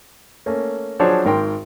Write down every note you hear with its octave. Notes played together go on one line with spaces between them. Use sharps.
A3 A#3 C#4
F3 F#3 D4 G#4 C5 C#5
G#1 G#2 A#4 G5 C6